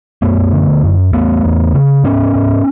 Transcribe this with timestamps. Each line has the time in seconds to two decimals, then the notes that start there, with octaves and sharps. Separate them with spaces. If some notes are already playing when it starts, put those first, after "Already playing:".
0.22 F#2 A3 B3
0.53 D3
0.83 F#2
1.13 E2 A3 B3
1.44 E2
1.74 C#3
2.04 G#2 B3 C#4
2.35 G#2